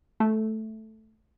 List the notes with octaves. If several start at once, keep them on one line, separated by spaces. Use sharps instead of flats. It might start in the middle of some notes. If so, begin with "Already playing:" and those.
A3